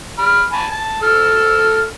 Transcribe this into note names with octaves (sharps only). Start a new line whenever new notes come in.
B5 F6
G#5 A5 B5
A5
A4 E6 F6